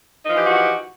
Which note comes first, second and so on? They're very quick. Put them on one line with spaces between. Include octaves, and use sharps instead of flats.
D#4 F3 E3 G4 F#4